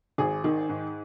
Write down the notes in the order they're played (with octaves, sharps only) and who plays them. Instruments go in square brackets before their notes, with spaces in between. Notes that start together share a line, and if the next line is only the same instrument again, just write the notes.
[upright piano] G#1 G#4
D#3
G#2